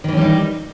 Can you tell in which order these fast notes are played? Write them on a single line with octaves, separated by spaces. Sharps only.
D#3 E3 C#4 G3 D#4